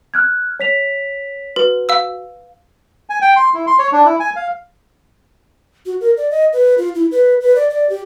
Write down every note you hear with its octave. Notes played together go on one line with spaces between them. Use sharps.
F6 F#6 G#6
C#5 B6 F7
F#4 B4
F5 E6
G#5
G5
C6
E4
C6
C#5
D4
E4
G#5
F5
F#4
A#4
D5
D#5
B4
F4
E4
B4
B4
D5
D5
G4